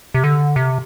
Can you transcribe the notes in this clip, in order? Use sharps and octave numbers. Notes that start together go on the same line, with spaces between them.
C3
D3
C3